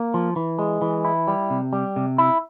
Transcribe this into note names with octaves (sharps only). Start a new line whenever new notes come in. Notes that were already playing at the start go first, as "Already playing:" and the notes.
Already playing: A#3
F3
E3
G#3
E3
E4
G3
C3
G3
C3
E4